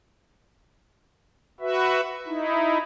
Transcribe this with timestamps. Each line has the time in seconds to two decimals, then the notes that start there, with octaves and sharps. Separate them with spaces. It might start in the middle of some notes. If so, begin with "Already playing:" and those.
1.61 F#4 B4 E5
2.27 D#4 E4